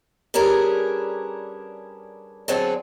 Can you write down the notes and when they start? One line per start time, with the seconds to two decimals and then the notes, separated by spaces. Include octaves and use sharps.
0.34 G3 C#4 D4 G#4 A#4 B4
2.48 D3 F#3 C4 G#4 A4